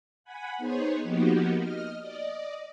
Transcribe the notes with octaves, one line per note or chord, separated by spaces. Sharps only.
F#5 G#5 B5
B3 D#4 G#4 C5 C#5
F3 A#3 B3 D#4 F#4 G4
D#5 F6
D5 D#5